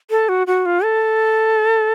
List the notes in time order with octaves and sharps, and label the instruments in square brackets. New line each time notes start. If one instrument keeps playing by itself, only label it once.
[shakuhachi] A4
F#4
F#4
F4
A4